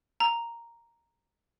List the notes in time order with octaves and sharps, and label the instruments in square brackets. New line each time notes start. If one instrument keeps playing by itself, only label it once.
[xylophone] A#5